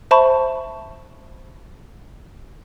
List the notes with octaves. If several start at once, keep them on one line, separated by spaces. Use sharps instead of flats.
C5 E5 A5 B5 C#6